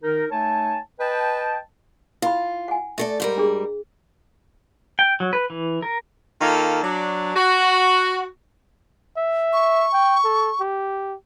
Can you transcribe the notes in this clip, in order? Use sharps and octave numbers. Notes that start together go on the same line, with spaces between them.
D#3 D#4 A#4
A3 D#4 C#5 G#5 A5
B4 D#5 G5 A5
E4 F4 B5
F#5 G#5
A3 A4 D5 E5
G#2 G3 A#4
D4 G#4
G5
F#3
B4
E3
A#4
D#3 A#3 F4 A4
F#3 D4
F#4
E5
C#6
G5
A4
G4